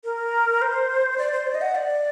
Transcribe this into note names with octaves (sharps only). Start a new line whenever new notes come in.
A#4
C5
D5
C5
D5
D#5
F#5
D5